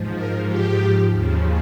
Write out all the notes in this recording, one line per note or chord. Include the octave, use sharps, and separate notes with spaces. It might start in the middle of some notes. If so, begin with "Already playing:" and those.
Already playing: G#2 F3
A#4
G4
D#2 C#3 F3